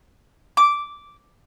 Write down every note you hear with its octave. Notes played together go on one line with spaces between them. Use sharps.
D6